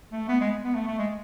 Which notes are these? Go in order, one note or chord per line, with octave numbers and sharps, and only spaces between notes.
A3
B3
G#3
B3
A3
A3
G#3